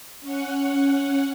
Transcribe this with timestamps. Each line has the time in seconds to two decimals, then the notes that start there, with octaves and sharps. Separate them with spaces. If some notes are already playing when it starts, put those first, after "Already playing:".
0.21 C#4 F#5